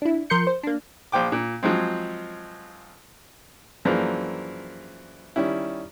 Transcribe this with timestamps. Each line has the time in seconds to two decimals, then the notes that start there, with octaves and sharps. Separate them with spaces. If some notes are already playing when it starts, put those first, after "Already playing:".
0.02 D4 E4
0.30 F3 A#4 C6 G6 C#7
0.47 C5
0.63 A#3 D4
1.12 A#1 C5 G5 D6
1.32 A#2
1.63 F3 F#3 G#3 C4
3.85 F#2 E3 F3 G#3 A#3 D4
5.36 D#3 G3 C#4 E4